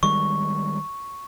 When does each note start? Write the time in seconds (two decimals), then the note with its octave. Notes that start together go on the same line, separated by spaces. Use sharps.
0.03 D#3 G3 G#3 C#6